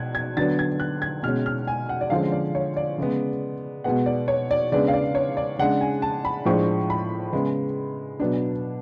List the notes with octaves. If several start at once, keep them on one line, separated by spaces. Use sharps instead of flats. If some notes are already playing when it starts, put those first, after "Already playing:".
Already playing: B2 F#6 G#6
G#6
D3 F#3 B3 D4 A6
G#6
F#6
G#6
B2 G#3 C#4 F6
F6
G#5
F#5
D5
D3 F3 G#3 C#4 F5
D5
C#5
D5
C#3 G#3 B3
B2 G#3 B3 F#5
D5
C#5
D5
C#3 G#3 B3 D4 D5
F5
D5
C#5
D5
C#3 G#3 D4 F#5
G#5
A5
B5
A2 F3 G#3 D4 C#6
B5
C#3 G#3 B3
B2 F#3 B3 D4